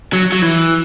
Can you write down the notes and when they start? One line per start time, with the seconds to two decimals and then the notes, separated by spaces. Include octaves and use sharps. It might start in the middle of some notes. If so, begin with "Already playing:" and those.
0.13 F#3
0.32 F#3
0.42 E3